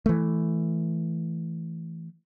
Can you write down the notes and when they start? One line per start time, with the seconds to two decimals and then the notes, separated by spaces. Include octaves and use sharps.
0.06 E3 A3